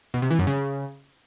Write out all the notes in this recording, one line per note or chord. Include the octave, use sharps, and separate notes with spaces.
B2
C3
E3
F#2
C#3